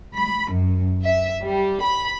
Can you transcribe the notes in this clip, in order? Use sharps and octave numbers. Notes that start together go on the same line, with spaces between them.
B5
F#2
E5
G3
B5